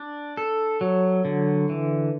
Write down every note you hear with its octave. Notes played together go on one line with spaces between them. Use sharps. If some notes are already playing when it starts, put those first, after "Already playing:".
Already playing: D4
A4
F#3
D3
E3